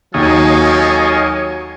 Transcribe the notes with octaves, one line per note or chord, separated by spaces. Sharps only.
D#2 F#3 G4 A4 C#5 D#5 F5 G#5